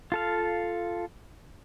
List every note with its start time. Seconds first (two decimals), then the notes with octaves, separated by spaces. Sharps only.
0.12 F4 A4 F5